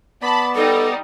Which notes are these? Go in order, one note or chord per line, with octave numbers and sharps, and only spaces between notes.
B3 D5 A5 B5
G3 D#4 A4